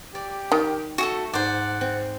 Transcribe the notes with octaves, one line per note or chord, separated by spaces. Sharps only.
G4 D5
D#3
A3 F#4 G#4 A4
G#2 C5 D5 F#5
C4